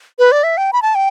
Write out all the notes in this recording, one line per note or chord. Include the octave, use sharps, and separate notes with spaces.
B4
D5
E5
G5
B5
A5
G5